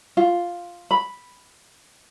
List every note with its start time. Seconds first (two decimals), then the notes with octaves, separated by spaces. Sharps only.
0.17 F4
0.91 B5